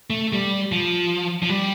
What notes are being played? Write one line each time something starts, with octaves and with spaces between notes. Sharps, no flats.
A3
G3
F3
F3
G3